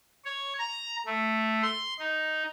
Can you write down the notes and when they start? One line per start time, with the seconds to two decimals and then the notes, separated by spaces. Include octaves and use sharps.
0.25 C#5
0.59 A#5
1.06 A3
1.62 C6
1.99 D#4